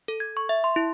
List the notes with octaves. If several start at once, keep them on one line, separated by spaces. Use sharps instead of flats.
A4
G#6
C#6
E5
C6
E4